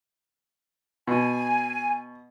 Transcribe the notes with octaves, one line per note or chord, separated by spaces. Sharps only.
B2 G#5